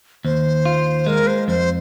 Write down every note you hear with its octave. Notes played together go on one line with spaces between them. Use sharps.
D#2 C5
F4
G#3 A#4
C5
F2 C5